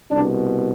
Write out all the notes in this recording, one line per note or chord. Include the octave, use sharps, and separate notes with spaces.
C2 B2 D4